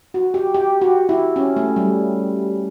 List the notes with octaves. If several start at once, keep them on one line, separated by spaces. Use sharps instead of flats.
F#4
G4
G4
F#4
E4
C#4
A3
G3